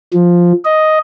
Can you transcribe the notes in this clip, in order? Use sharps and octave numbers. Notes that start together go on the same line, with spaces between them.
F3
D#5